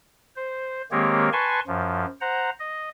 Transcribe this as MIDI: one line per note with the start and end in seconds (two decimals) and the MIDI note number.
0.36 0.82 72
0.91 1.29 51
0.91 1.29 56
0.91 1.29 58
0.91 1.29 60
0.91 1.29 67
0.91 1.29 73
1.33 1.60 71
1.33 1.60 80
1.33 1.60 81
1.33 1.60 84
1.33 1.60 85
1.67 2.05 42
1.67 2.05 53
2.21 2.50 72
2.21 2.50 78
2.21 2.50 82
2.60 2.89 75